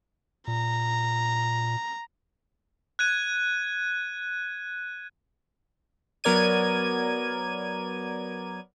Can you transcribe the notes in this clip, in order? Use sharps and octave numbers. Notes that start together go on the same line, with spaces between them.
A#2 A#5
F#6 G#6 D#7
F#3 B3 A#4 D5 G#6 D#7